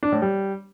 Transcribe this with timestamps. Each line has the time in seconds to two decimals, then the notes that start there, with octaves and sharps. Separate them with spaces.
0.03 D4
0.12 A2
0.22 G3